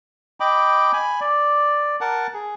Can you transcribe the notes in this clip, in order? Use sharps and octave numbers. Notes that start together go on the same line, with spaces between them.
D#5 G5 B5 D6
G#5 B5
D5
A#4 F#5 A5
G#4